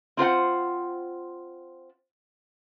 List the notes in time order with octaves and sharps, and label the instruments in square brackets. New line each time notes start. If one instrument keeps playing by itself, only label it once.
[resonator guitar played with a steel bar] C4 F4 C5 F#5